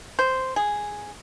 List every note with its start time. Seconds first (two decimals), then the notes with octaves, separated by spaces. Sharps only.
0.19 C5
0.56 G#4